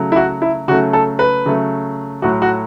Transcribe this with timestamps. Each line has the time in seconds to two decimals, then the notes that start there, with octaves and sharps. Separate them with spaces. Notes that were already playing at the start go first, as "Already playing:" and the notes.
Already playing: C#3 F#3 A3
0.12 E4
0.16 F#4
0.42 E4
0.68 C#3 F#3 A3 F#4
0.93 A4
1.19 B4
1.45 C#3 F#3 A3
2.22 A2 F#3 A3 F#4
2.42 F#4